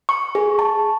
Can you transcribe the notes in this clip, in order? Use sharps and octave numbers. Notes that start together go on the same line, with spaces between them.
C#6
G#4
A5